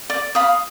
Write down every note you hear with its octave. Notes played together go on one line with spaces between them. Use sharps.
D5
F5 B5 D#6